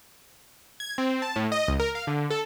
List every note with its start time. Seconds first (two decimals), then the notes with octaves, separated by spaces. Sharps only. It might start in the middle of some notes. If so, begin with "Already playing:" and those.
0.80 G#6
0.98 C4
1.22 A5
1.36 A2
1.52 D#5
1.68 C#2
1.80 A#4
1.95 F5
2.07 D3
2.30 A4